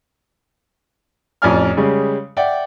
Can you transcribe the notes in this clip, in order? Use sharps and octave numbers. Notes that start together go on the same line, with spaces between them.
A1 F2 C#4 D5 G#5 F6
C#3 G3 G#3 C#4
D5 E5 F#5 G5